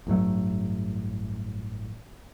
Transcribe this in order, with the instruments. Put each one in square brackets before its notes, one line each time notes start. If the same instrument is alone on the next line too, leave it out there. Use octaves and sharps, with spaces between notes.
[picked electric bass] A1 G2 F#3 A3